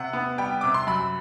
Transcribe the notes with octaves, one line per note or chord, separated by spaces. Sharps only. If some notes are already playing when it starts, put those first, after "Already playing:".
Already playing: C3 F#5
B3
G3 G5
C3 D6
C6
F#2 B5